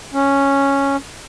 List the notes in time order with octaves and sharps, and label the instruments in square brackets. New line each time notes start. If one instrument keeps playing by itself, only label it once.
[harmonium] C#4